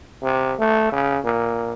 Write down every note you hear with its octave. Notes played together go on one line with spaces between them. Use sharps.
C3
A3
C#3
A#2